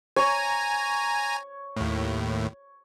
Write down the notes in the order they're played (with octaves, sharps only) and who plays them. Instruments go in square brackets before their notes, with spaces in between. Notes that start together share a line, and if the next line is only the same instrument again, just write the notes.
[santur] C#5 [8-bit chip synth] G#5 A#5
[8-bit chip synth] D#2 A2